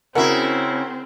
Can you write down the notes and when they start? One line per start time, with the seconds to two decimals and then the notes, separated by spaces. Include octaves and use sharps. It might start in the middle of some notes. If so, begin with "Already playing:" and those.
0.15 C#3 C4 E4 F#4 A#4 F#5